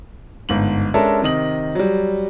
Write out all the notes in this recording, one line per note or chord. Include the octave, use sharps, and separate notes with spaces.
G1 G#2 F#7
G#3 C#4 D4 A4 A#4 E5
C3 D#3 D#5 F#7
F#3 G3